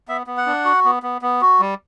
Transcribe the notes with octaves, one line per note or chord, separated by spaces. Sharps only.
B3 E5
B3
F#5
D4
F#4
B3
B3
B3
F#4
G3